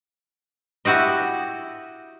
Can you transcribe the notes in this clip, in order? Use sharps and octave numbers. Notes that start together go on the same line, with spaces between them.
E4 F#4 G4 D#5